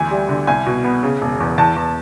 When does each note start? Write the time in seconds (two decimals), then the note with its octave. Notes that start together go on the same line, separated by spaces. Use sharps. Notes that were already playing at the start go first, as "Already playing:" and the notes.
Already playing: D2 E3 G#5
0.11 G3
0.29 D3
0.47 C2 G#5
0.66 B2
0.84 B3
1.03 C#3
1.21 E1
1.40 E2
1.58 E2 A5
1.76 E2